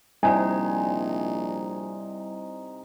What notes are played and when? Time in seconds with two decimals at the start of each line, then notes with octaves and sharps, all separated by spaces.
0.23 A#1 C3 G3 D#4 E4 D5 G#5